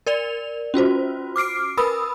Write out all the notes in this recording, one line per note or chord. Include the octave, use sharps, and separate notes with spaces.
A#4 D5 F7
C#4 F4 F#4 C5
D6 F6 C7 D7
A#4 B4 B5 D#6 E6